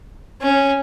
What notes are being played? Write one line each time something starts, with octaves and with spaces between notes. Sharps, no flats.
C#4